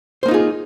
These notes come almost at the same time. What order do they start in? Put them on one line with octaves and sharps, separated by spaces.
C5 A#3 D#4 F4 G#4